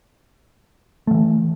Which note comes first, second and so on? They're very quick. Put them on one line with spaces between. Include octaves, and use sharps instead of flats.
A3 F3 E3